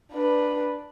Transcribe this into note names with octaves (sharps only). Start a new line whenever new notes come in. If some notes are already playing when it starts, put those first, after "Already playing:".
D4 B4